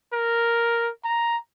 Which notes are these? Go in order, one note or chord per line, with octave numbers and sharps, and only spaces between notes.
A#4
A#5